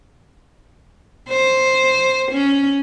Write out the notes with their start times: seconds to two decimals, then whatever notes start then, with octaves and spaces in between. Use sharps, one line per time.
1.29 C5
2.32 C#4